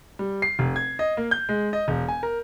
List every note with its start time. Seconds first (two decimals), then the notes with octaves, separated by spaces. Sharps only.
0.19 G3
0.42 C7
0.59 F1
0.76 G#6
0.99 D#5
1.17 A#3
1.31 G6
1.49 G#3
1.73 D#5
1.88 E1
2.08 G#5
2.23 A#4